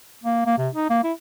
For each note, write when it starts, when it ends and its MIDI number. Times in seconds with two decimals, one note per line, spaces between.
0.24 0.43 58
0.46 0.56 58
0.58 0.69 48
0.75 0.89 63
0.90 1.01 58
1.04 1.12 64